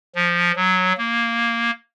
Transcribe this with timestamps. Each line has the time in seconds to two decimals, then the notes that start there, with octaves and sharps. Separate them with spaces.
0.15 F3
0.56 F#3
0.97 A#3